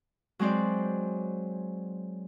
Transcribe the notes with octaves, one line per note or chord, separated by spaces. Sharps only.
F#3 G#3 C4 C5 D5